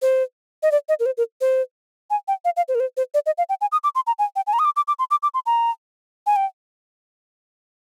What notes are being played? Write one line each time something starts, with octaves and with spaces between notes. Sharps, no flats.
C5
D#5
D5
D#5
A#4
C5
A#4
C5
G#5
G5
F5
F5
C5
A#4
C5
C5
D5
D#5
F5
G5
G#5
D#6
D6
C6
A#5
G#5
G5
G#5
A#5
D#6
D6
D6
D6
C6
D6
D6
C6
A#5
G#5
G5